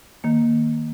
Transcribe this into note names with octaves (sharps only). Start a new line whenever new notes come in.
D#3 A#3